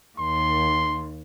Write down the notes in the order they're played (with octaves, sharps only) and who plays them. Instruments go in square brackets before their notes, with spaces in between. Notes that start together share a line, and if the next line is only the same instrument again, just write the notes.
[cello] D#2 [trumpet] C6